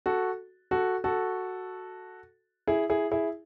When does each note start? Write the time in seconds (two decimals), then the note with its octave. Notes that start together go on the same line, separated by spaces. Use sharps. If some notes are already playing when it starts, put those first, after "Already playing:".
0.06 F#4 A4
0.71 F#4 A4
1.04 F#4 A4
2.67 E4 G#4
2.90 E4 G#4
3.11 E4 G#4